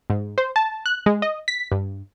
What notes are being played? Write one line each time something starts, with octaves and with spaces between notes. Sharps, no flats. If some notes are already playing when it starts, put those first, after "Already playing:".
G#2
C5
A5
F#6
G#3
D#5
B6
G2